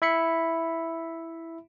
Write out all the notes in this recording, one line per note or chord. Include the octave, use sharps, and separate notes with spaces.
E4 E5 B5 C#7